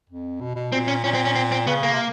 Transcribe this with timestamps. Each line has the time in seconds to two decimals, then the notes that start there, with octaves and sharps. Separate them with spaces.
0.10 F2
0.41 B2
0.56 B2
0.72 A#2 C4
0.88 C#4
1.04 A#2 C#4
1.14 C4
1.25 C#4
1.35 C4
1.52 C4
1.67 C#3 B3
1.83 A#3
1.93 C3